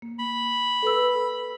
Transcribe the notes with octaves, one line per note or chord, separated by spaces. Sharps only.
A#3
B5
A4 B4 E6